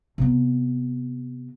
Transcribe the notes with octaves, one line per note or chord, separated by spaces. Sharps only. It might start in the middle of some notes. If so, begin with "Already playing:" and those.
C3 B3